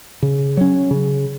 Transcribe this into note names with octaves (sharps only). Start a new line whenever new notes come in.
C#3
F#3 C#4
C#3